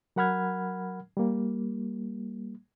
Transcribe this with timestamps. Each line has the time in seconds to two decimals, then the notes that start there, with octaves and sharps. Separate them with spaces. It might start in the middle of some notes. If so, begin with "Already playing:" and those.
0.16 F#3 A#4 F#5 B5 F6 G#6
1.17 G3 A#3